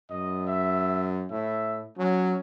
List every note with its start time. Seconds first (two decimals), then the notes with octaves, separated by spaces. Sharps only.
0.10 F#2 D#5
0.47 E5
1.30 A2 E5
1.98 F#3 C#4